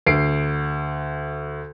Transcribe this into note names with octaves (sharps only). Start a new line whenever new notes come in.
D2 C7 D7